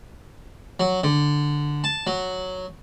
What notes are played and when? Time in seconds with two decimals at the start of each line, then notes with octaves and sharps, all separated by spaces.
0.80 F#3
1.04 D3
1.84 A5
2.07 F#3